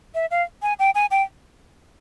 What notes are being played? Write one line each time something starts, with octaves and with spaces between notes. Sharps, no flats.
E5
F5
G#5
G5
G#5
G5